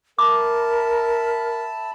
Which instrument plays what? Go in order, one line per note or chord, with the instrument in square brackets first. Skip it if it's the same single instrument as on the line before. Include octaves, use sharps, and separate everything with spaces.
[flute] A#4 [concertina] E5 A5 B5 [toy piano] D6